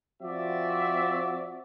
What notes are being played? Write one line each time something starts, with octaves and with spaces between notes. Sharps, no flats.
F3 C4 F#4 D5 E5